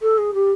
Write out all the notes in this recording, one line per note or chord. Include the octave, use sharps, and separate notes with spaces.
A4
G#4
G4